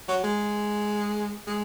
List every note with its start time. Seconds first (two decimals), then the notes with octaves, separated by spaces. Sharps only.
0.08 F#3
0.24 G#3
1.47 G#3